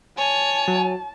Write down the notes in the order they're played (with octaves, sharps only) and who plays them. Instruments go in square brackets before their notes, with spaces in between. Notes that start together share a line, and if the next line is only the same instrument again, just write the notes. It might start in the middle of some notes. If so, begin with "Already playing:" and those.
[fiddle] C#5 [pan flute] G#5 [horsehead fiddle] A5
[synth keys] F#3